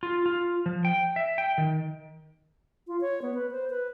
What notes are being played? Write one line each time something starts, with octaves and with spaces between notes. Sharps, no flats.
F4
F4
F3
G5
E5
G5
D#3
F4
C#5
B3
B4
C5
B4